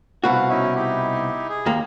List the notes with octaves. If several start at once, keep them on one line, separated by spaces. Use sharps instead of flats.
C2 B2 F#4 F5 F#5
C#4 D#4 E4
D#4 E4 G4
G#4
D#2 A#3